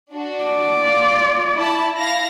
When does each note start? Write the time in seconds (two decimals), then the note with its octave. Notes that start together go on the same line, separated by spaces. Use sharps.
0.12 D4 F#4
0.44 D5
0.83 F4
1.55 E4 A5
1.98 E4 F5 A#6